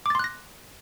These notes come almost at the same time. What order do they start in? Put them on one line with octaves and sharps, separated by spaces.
D6 A6 C6 F#6 A#6